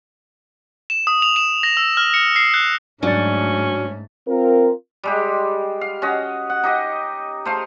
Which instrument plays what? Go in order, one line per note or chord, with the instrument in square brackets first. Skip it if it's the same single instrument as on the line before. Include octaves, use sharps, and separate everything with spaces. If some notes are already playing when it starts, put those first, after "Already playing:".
[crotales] E7
D#6
F7
E7
A#6
E6
F6
C#7
C7
F#6
[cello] G#2 A3 [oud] F#3 [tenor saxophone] C#4 [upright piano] D4 D5 A6
[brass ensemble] C4 F4 A#4
[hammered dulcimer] G3 G#3 G4
F5
C#4 F#4 D#5
F#5
D#4 G4 D#5
A3 C5 F5